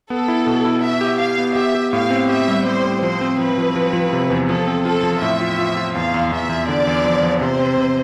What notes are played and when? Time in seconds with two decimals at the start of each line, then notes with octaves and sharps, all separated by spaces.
0.10 B3 A4
0.28 E4
0.47 B2
0.65 E4
0.83 E4 E5
1.01 G4
1.20 G4 F5
1.38 B3
1.56 G4 E5
1.75 G4
1.93 A2 F5
2.11 C4
2.29 G4 E5
2.48 G3
2.66 G3 C5
2.84 A2
3.02 F3 C5
3.21 C4
3.38 F3 B4
3.58 F3
3.76 F3
3.93 F3
4.13 C3
4.30 E2
4.48 F3 A4
4.67 C4
4.85 F4 A4
5.03 F3
5.22 A2 E5
5.41 F4
5.58 F4
5.77 F4
5.95 E2 F5
6.14 E2
6.32 E2 E5
6.49 E2
6.68 D3 D5
6.87 E2
7.04 F3
7.23 F3
7.41 C3 C5
7.59 C4
7.78 C3